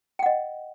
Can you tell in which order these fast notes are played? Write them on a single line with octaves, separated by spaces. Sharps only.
G5 F#5 D#5